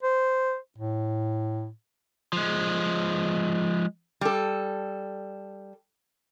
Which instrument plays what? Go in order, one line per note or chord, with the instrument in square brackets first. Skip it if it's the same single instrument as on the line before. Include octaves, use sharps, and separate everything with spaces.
[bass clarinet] C5
A2
[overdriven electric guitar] F3 G#3
[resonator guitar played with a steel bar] G3 A4